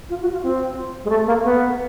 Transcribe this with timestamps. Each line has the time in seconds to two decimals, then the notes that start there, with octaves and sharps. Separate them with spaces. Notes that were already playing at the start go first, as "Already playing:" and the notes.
0.10 F4
0.21 F#4
0.32 F4
0.43 C4
1.05 G#3
1.10 A3
1.27 A#3
1.44 B3